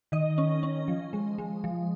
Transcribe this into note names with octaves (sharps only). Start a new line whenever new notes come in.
D#3 D#5
C#4
C#4
F3
G#3
G#3
F3